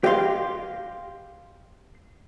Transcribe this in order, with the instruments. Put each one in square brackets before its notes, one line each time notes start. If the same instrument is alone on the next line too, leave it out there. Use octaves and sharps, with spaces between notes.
[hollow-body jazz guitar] G4 D#5 F5 C6